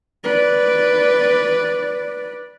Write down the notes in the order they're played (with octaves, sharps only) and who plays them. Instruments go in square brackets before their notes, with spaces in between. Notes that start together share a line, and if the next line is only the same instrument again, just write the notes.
[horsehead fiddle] B4 D5